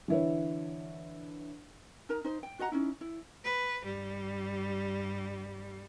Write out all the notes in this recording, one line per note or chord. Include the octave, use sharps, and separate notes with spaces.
D3 E3 E4 B4 C#5
D#4 A#4 A#5
D#4 C5
G5
F#4 D#5 F#5 A#5
C#4 D#4 E4
E4
B4
G2 G3